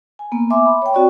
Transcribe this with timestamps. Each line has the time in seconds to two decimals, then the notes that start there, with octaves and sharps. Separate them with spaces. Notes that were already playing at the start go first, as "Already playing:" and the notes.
0.19 G#5
0.32 A#3 B3
0.50 E5 G#5 C6 D6
0.66 B5
0.82 C#5 G5
0.93 C4 F#4 D5 C#6